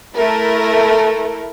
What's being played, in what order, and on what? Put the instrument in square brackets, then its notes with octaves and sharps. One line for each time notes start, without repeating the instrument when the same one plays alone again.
[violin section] A3 E4 A#4